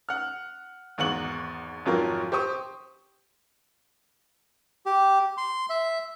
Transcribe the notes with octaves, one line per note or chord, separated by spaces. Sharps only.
F#5 F6
G#1 E2 F#5 F#7
G#1 F2 F#3 F4 A#4
G4 C5 C#6 D#6
G4
C6
E5